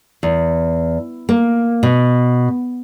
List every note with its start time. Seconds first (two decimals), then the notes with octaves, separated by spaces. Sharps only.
0.23 E2
1.29 A#3
1.83 B2